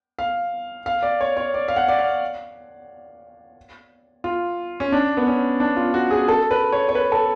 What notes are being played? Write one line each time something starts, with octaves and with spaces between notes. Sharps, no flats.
F5
F5
D5
C#5
C#5
D5
F5
F#5
D5
F5
F4
C#4
D4
B3
C#4
D4
F4
F#4
G#4
A4
B4
C#5
C#5
B4
A4